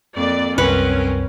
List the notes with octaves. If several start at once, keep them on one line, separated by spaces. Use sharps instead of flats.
F2 A#3 D5
C2 F#2 C4 C#4 A#4 B4 F#5